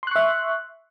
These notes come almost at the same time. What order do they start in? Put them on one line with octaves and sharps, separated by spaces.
C6 F#6 C#6 E5